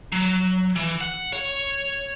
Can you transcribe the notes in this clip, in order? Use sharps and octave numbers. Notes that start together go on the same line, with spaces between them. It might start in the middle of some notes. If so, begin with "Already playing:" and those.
F#3
E3
F#5
C#5